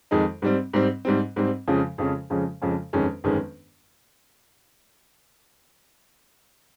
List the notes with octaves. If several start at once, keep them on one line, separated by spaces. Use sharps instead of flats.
F2 D#3 G#3 D#4
G#2 G3 C4
G#2 G3 C4
G#2 G3 C4
G#2 G3 C4
F2 C#3 F3 G#3 C#4
F2 C#3 F3 G#3 C#4
F2 C#3 F3 G#3 C#4
F2 C#3 F3 G#3 C#4
G1 F2 D#3 G#3 C#4
G1 F2 D#3 G#3 C#4